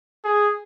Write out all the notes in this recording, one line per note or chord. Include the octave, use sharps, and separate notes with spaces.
G#4